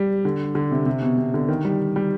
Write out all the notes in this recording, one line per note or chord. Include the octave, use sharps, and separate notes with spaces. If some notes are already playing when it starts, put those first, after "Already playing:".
Already playing: G3
D3
D3
C3
C3
B2
C3
D3
D#3
G3
G3